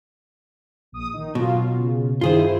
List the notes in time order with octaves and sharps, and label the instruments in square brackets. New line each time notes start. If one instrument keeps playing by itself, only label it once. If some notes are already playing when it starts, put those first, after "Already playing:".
[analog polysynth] A#1 D#6
D#3 D#4
[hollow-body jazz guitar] B2 [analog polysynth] F#3 F4
[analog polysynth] C#3
[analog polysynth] G2 D#3 E4 [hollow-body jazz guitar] F4 G#4 C5